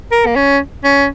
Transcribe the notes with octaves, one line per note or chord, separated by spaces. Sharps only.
A#4
A#3
C#4
C#4